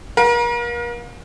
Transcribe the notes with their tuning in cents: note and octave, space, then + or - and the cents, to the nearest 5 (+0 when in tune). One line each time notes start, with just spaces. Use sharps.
A#4 +40 F5 +35